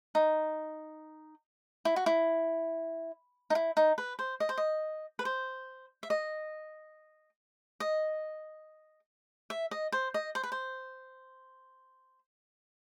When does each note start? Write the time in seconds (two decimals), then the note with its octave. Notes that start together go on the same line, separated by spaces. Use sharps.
0.15 D#4
1.85 E4
1.96 F#4
2.06 E4
3.50 D#4
3.55 E4
3.77 D#4
3.98 B4
4.19 C5
4.40 D#5
4.49 C5
4.58 D#5
5.19 B4
5.25 C5
6.03 E5
6.10 D#5
7.80 D#5
9.50 E5
9.71 D#5
9.92 C5
10.14 D#5
10.35 C5
10.43 B4
10.52 C5